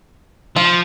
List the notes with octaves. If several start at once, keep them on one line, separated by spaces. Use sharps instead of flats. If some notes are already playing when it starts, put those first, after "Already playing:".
F3 F4